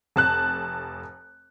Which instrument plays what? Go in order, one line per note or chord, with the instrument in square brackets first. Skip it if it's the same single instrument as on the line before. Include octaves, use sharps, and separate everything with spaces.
[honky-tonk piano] F1 A5 F#6